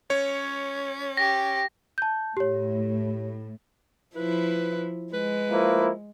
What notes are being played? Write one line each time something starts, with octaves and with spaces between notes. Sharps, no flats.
C#4 C#5
G4 A#6
A5 G6
A2 G4 C#5
F3 E4 B4
G#3 B4
F3 A#3 E4